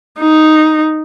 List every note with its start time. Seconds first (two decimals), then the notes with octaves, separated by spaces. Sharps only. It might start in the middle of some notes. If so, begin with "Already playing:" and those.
0.20 D#4